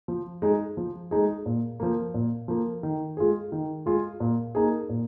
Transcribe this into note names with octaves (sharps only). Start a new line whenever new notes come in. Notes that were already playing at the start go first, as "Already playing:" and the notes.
F3
G#3 D#4 G#4
F3
G#3 D#4 G#4
A#2
F3 A#3
A#2
F3 A#3
D#3
G#3 F4 G#4
D#3
G#3 F4 G#4
A#2
A#3 D#4 G#4
A#2